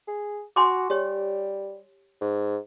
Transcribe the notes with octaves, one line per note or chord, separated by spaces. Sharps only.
G#4
F#4 G#5 C6 D6
G3 G4 C#5
G#2